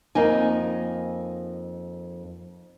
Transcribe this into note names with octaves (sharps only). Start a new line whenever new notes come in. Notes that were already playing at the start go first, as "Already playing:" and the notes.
F2 A#3 D#4 G#5